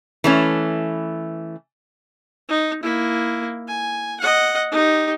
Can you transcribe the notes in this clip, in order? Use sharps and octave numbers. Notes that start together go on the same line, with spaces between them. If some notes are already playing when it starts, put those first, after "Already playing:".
E3 A3 C#4
D#4
A#3 E4
G#5
D#5 F#5
D#4 G4